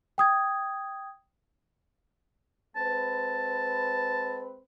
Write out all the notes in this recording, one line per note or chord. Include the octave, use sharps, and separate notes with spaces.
G5 D#6 G#6
G#3 C4 B4 A5